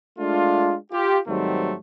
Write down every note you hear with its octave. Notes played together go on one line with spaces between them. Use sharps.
G#3 A3 D4 F4
F4 G4
G#2 D#3 F#3 G3 A3 C4